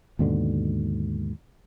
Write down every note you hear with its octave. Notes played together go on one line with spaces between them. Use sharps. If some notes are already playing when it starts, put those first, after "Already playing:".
D#2 G#2 B2 D3